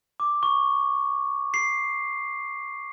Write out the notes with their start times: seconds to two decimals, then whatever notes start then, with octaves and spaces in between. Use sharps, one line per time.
0.20 D6
0.43 C#6
1.54 C7